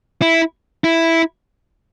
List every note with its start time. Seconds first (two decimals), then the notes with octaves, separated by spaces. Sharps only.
0.22 E4
0.84 E4